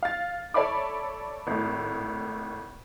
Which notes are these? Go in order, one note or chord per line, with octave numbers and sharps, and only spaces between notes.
F5 A6
A4 C#5 D5 E5 B5 D6
G#1 A2